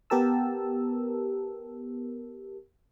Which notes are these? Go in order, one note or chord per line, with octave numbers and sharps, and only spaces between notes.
B3 G4 A#4 A5 E6